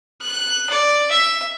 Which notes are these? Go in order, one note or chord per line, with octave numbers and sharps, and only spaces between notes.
F#6
D5
E5